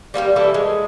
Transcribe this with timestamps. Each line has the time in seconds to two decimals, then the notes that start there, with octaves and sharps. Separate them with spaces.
0.14 G3 A#3 E4 G4
0.36 E3 G3 E4 A4
0.54 G#3